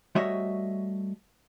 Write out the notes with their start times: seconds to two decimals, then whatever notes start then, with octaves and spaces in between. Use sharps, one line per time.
0.15 G3 A3 F#4 C#5 D#5 E5